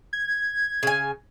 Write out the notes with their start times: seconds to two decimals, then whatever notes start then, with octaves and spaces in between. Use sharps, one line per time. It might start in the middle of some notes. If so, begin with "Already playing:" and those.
0.13 G#6
0.83 C#3 G#5